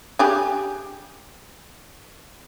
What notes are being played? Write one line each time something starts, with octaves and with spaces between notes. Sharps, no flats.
D4 G4 G#4